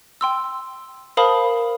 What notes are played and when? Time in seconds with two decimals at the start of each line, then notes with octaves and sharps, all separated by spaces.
0.21 G5 C6 E6
1.17 A#4 C5 F5 A5 B5 D#6